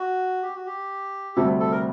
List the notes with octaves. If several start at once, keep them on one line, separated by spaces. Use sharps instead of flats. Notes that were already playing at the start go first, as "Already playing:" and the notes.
Already playing: F#4
G4
F#4
G4
D2 C3 G3 A4
A4
A#4